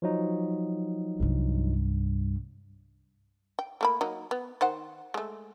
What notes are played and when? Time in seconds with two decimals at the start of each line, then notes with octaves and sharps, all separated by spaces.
0.02 F3 F#3 D#4
1.20 C2 G2
3.59 G5
3.81 A3 A#3 B5
4.01 F#3 A#3 D#4
4.31 B3
4.61 D#3 C5 F#5
5.14 G#3 A3